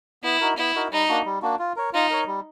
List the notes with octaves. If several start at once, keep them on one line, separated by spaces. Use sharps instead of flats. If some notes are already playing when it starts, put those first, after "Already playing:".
B3 E4
D#4 F#4 A#4
B3 E4
D#4 F#4 A#4
G3 D#4
A#3 D4 F#4
G3
A#3 D4 F#4
F4
A#4 C#5
D#4 F4
A#4 C#5
G3